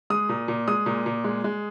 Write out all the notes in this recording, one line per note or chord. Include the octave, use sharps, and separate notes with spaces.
G#3 D#6
A#2
A#2
G#3 D#6
A#2
A#2
G#3
G#3